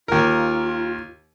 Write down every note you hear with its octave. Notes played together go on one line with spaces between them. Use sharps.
D#2 F4 A#4